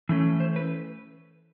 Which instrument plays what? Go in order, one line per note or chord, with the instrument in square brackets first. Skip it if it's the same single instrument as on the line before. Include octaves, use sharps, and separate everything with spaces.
[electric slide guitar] E3 A3 C#4
C5
B4